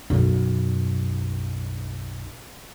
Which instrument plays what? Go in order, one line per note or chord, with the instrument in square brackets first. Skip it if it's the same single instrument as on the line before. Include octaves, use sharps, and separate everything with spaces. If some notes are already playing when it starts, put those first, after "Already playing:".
[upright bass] B1 F#2